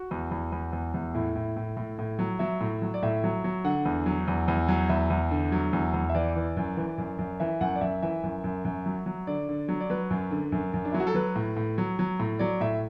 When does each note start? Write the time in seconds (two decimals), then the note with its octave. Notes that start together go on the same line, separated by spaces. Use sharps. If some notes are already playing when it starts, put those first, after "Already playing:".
Already playing: F#4
0.11 E2
0.31 E2
0.52 E2
0.73 E2
0.94 E2
1.14 A2 E4
1.35 A2
1.56 A2
1.77 A2
1.99 A2
2.19 F#3
2.39 F#3 E5
2.61 A2
2.82 F#3
2.94 D5
3.03 A2 E5
3.24 F#3
3.44 F#3
3.64 D3 F#5
3.85 E2
4.06 F#3
4.28 E2
4.48 E2
4.68 F#3
4.89 E2 E5
5.10 E2
5.31 D3
5.52 F#3
5.73 E2
5.94 E2
6.09 E5
6.15 E3 D5
6.36 E3
6.57 F#2
6.77 E3
6.98 F#2
7.19 F#2
7.40 E3 E5
7.61 F#2 F#5
7.76 D5
7.81 F#2 E5
8.02 E3 E5
8.23 F#2
8.44 F#2
8.65 F#2
8.86 F#3
9.06 F#3
9.27 D3 D5
9.49 D3
9.68 F#3
9.80 D5
9.90 F#3 B4
10.10 F#2
10.31 D3
10.52 F#2
10.74 F#2
10.85 D4
10.92 F#3 E4
11.00 F#4
11.07 A4
11.14 F#3 B4
11.36 A2
11.57 A2
11.78 F#3
11.99 F#3
12.20 A2
12.39 F#3 D5
12.61 A2 E5